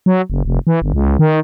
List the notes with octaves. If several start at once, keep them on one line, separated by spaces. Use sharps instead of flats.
F#3
F#1
F1
E3
G1
C#2
D#3